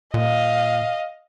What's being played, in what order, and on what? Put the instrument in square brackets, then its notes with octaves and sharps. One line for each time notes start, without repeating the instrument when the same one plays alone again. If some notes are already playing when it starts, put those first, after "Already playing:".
[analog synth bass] A#2 [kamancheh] D#5 F5